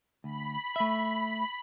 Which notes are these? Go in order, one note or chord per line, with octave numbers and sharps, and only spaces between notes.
D2 B5
A3 E5